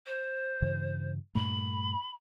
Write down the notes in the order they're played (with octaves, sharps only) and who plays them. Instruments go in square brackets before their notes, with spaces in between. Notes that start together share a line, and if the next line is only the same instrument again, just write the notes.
[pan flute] C5
[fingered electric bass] G2 C#3 E3
[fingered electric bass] G2 A#2 A3 [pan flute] B5